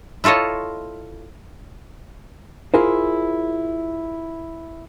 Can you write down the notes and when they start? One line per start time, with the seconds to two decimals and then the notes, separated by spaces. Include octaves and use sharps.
0.24 E4 F4 A4 C#5 D#5
2.74 E4 F4 G#4 A#4 C5